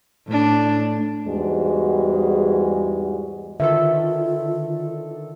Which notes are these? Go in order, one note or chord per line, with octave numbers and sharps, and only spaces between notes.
A2 D4
E2 G#2 G3 G#3 F#4
D3 D#3 F4 A4 B4 E5